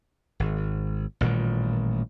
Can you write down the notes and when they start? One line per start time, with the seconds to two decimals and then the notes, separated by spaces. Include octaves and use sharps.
0.40 G#1
1.21 A1 A#2 D#3 G3